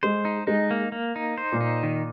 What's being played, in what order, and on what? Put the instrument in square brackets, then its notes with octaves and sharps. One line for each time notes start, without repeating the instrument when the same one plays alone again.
[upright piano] G#3 [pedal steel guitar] C5
[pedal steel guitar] D#4
[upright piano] G#3 [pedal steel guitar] D#4
[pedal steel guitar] A#3
A#3
D#4
C5
[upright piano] A#2
[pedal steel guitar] D#4
D#3